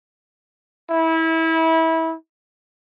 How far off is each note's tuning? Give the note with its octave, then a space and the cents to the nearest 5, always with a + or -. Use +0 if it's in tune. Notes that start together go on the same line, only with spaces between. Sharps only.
E4 -25